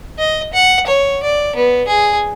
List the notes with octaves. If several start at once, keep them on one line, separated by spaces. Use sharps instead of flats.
D#5
F#5
C#5
D5
B3
G#4